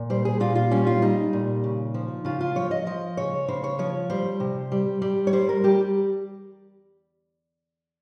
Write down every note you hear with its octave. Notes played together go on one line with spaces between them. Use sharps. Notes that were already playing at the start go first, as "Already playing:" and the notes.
Already playing: A#2
G3 C5
G#4
A#2 F4
F4
G3 C#4
F4
G3 D#4
A#2
C#3
F3
C#3 F4
F4
F3 C#5
D#5
F3 D#5
C#3 C#5
C#3 C5
C#5
F3 C#5
G3 C5
C3
G3
G3
C#5
G3 C5
A#4
G3 G4